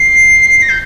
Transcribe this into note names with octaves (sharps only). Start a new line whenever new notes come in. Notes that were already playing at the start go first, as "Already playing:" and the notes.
Already playing: C7
A#6
G6